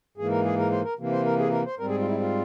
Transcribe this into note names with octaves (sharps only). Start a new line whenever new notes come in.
G#2 E3 A#3 G#4
A#4
G#4
A#4
C5
A#4
C3 E3 A#3
C5
A#4
G#4
A#4
C5
G#2 G3 C4 A#4
G#4
F4
E4
F4